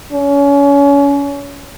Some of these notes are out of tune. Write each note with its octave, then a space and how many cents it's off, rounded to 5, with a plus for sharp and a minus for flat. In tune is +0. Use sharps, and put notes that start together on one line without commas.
C#4 +30